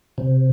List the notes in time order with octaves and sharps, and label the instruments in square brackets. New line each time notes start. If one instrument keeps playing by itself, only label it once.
[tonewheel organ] C3